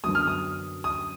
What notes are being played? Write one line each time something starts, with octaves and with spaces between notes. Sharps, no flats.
F#2 D3 F#3 B3 D#6
F6
D#6
D#6